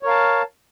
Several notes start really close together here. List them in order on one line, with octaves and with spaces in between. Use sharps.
C#5 A#4 F5 A5